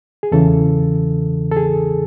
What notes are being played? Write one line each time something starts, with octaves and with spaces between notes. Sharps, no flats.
G#4
E2 C#3 E3 A4
A4
G#4